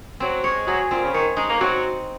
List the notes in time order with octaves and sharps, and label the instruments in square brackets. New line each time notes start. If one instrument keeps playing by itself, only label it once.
[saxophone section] F#3 [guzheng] C4
[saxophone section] G#3 [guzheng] C#5
[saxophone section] F#3 [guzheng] G#4
[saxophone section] A#2 [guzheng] C4
[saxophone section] C#3
[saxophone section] D#3 [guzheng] C#5
[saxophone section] G#3 [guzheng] D#4
[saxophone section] A#3
[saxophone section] F#3 [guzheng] C4